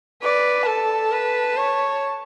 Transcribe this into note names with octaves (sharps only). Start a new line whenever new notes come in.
B4 D5
A4 A5
B4
C#5